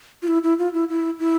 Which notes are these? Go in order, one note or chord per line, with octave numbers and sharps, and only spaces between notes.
F4
E4
E4
F4
E4
E4
E4